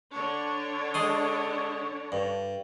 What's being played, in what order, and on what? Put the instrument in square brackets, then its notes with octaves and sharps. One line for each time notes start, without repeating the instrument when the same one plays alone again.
[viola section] D3 D4 C#5
[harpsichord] G#3 C6 D#6
G2